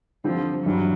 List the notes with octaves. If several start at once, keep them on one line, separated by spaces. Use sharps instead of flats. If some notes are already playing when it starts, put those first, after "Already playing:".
D3 F3 G3 C4 F4
G2 E3 F#3 G3